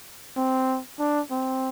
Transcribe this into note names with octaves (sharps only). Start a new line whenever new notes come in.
C4
D4
C4